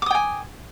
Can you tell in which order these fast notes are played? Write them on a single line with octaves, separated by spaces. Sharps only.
D6 D#6 G5 G#5